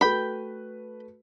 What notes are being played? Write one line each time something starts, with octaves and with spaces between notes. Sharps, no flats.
A3 F#4 B4 G5 B5